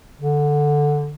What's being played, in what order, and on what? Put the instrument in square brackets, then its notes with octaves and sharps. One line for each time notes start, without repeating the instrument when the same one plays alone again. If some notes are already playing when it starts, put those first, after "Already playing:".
[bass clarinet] D3